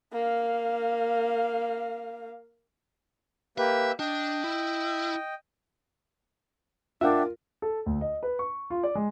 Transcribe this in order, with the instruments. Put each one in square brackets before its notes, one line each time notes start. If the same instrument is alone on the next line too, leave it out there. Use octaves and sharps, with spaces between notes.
[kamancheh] A#3 F5
[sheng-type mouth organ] A#3 G4 B4 [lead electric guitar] E5
[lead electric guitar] D4 [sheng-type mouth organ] D#5 G5
[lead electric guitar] E4
[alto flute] D4 [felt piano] F4 A#4 [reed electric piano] E5 F#5 G5
[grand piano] A4
D2
D#5
B4
C#6
F4
D5
G#3